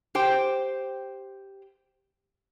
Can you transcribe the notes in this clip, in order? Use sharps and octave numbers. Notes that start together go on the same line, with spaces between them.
G4 C5 G5